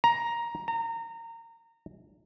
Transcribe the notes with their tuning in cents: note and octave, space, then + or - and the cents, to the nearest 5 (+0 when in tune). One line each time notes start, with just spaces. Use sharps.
A#5 +10
A#5 -25